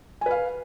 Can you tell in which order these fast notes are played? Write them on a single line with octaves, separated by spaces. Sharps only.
G#5 B4 F5